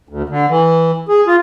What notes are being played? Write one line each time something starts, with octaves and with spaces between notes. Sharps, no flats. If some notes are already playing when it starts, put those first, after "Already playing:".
D2
D3
E3
G#4
F4